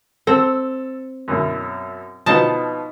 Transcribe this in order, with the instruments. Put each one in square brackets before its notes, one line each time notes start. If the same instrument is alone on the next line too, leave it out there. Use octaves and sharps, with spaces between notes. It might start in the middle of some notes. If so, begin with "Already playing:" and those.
[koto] C4 [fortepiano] A4
[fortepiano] F#2 B2 E4
[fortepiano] B2 F3 B3 [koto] D#4 A5